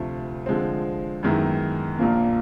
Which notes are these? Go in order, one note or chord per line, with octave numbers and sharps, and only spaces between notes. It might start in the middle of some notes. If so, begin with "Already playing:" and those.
Already playing: D2 C3 F3 A3
D3 F3 G#3 C4
F#2 D#3 G#3 B3 E4
A#1 A#2 F3 A#3